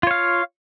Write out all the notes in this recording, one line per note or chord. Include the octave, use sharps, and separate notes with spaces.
F4 C#5 F5